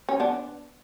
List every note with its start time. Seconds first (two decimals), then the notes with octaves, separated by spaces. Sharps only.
0.09 C#4
0.20 B3 D4